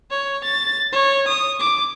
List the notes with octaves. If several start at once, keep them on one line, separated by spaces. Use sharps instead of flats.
C#5
A6
C#5
D#6
D6